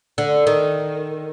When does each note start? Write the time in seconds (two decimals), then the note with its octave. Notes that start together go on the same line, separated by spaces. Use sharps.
0.18 D3
0.47 D#3